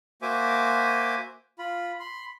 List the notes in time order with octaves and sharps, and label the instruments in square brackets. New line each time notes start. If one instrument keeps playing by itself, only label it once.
[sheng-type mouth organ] A#3 F#4 C5 E5 G#5 D6
F4 B5
B5 C6